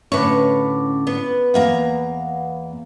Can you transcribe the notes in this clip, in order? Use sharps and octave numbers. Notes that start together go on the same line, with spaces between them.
A2 D3 C#4 B4 C#5 D6
B3
E2 A#3 F#5 A#5